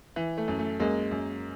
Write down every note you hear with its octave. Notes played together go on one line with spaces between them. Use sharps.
E3
A3
F#2
A3
F#2 G#3 A#3
F#2